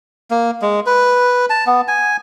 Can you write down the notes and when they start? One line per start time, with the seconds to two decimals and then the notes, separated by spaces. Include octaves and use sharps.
0.31 A#3
0.62 G#3
0.86 B4
1.50 A5
1.67 B3
1.88 G#5